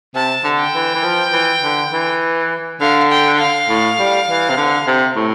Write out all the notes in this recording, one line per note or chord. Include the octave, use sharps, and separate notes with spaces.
C3 A5
D3
G5
E3
E3
F3
E3
D3
E3
D3 F5
G5
F5
A2
G3
E3
C3
D3
C3
A2